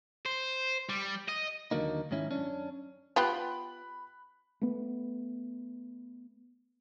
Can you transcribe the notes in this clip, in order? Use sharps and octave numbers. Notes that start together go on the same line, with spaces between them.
C5
G3
D#5
D#2 D3 F#3 A#3 D#4
G#2 D#3 C#4 E4
F#2 C#4 D4
B3 F4 G4 B5 F#6
A3 B3